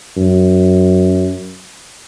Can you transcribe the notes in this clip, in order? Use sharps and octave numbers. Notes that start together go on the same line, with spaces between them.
F#2